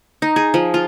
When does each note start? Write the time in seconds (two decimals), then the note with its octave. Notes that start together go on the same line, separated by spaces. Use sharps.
0.22 D#4
0.36 G#4
0.54 F3
0.74 F4